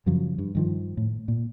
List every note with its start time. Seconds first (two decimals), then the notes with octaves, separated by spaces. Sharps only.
0.06 F#2 C#3 F3 F#3
0.38 G2
0.55 G2 D#3 F3
0.97 A2
1.28 A#2